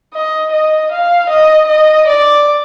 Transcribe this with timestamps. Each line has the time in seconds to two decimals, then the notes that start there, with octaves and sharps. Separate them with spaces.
0.13 D#5
0.53 D#5
0.92 F5
1.29 D#5
1.68 D#5
2.07 D5